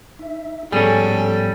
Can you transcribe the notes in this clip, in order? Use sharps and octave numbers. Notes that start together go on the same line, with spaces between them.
D#4 E5
G#2 F3 G3 B3 C#4 G#4 A4